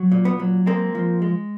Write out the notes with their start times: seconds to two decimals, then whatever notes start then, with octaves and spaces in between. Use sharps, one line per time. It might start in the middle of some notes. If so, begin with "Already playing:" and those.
Already playing: F#3
0.12 A#2
0.25 B3
0.40 F#3
0.66 G#3 A#3 C4
0.95 F3
1.22 G#3